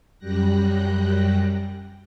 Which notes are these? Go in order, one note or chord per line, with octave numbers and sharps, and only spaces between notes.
F#2 G3 G5 F#6 A#6